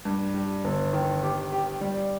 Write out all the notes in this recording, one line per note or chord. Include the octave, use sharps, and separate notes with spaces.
G2
G3
G1
D#3
G4
G4
G3